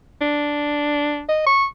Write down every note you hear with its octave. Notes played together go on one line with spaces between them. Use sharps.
D4
D#5
C#6